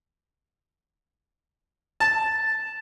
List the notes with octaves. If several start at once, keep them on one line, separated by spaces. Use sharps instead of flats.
A5